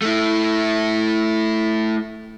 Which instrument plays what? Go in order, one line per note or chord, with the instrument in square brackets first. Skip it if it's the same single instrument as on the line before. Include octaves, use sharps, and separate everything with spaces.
[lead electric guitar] A3 E4